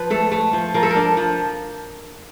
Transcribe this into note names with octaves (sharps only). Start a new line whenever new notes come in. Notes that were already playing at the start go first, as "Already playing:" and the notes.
Already playing: F3 B4
A3 A4
A3
F3
F3 A#4
A4
D4 A#4
F3